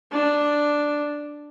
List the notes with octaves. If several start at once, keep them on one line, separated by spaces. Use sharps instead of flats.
D4